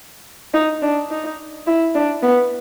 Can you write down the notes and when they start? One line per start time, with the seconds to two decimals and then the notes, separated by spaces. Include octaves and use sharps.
0.54 D#4
0.82 D4
1.11 D#4
1.66 E4
1.94 D4
2.23 B3